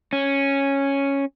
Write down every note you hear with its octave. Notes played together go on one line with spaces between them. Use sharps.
C#4